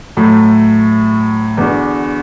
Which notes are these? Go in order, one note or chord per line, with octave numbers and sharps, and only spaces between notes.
A2 F#3 A3
E2 D3 B3 F#4 D5